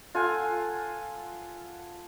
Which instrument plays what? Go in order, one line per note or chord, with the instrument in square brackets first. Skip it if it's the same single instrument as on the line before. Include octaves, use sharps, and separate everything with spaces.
[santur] F4 A4 F#5 G#5